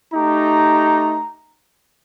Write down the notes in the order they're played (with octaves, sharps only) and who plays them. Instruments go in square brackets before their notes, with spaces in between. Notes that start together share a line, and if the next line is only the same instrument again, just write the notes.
[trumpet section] A3 D#4 G4 A#5